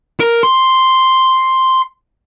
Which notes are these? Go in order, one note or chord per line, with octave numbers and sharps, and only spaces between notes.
A#4
C6